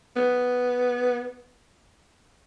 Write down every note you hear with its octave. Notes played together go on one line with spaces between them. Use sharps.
B3